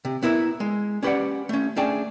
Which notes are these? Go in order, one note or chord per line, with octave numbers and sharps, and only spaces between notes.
C3
B3 E4 A#4 E5
G#3
C#4 G4 B4 C#5 D5 F#5
A3 C#4
A3 C#4 D4 G#4 G5 A5